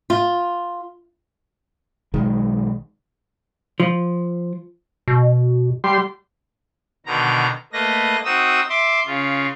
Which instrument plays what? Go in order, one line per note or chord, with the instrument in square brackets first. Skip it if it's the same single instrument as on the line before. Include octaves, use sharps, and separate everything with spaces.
[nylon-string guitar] F4
[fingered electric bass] B1 D#3 G#3
[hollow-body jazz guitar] F3
[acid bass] B2
[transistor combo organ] G3 C6
[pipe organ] B2 D3 D#3 A#5
A3 A#3 B4 D#5 A#6
C4 D#4 F#4 D#6 E6
E5 C6 D6
C#3 F4